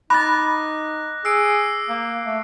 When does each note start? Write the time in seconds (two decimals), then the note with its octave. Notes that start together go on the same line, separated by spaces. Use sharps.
0.10 D#4 B5 D6 F#6 A6 A#6
1.25 G#4 E6 C7 D7
1.89 A#3
2.25 A3